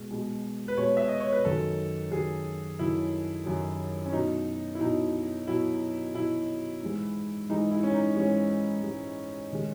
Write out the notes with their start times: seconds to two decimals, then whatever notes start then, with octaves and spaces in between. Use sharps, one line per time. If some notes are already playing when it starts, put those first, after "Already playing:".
Already playing: B2 G#3
0.11 B2 G#3
0.68 B4
0.77 B2 G#3 C#5
0.97 E5
1.08 D#5
1.20 C#5
1.32 B4
1.44 F#2 D#3 F#3 A4
2.12 F#2 D#3 F#3 G#4
2.79 F#2 D#3 F#3 E4
3.46 F#2 D#3 F#3
4.06 C#4
4.13 B2 F#3 D#4
4.75 E4
4.81 B2 F#3 D#4
5.47 B2 F#3 E4
6.14 B2 F#3 E4
6.82 G#2 E3 G#3
7.49 G#2 E3 G#3 D#4
7.71 E4
7.83 C#4
7.94 D#4
8.16 G#2 E3 G#3 C#4
8.83 G#2 E3 G#3
9.53 D#3 G#3